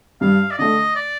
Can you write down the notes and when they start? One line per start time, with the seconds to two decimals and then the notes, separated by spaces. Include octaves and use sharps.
0.21 G2 F5
0.51 D5
0.58 D3 A3 D#5
0.95 D5